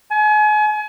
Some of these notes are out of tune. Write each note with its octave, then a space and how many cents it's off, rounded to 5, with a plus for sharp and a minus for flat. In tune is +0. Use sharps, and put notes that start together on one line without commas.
G#5 +35